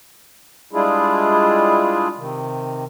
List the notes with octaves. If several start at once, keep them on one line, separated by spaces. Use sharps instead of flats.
G3 G#3 D4 E4 F4 G#4
C3 D#3